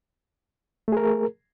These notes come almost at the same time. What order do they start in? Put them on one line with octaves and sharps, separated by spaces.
A3 G#4 A#4